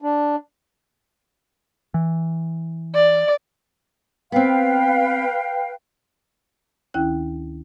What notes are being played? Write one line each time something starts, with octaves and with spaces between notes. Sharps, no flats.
D4
E3
D5
B3 C4 B4 F5 G5
D2 D#3 C#4 E4 G5 F#6